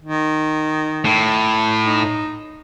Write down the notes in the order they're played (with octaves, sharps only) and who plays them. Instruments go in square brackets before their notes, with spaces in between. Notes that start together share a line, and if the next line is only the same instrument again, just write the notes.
[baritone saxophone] D#3
[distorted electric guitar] A2
[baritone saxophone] D#4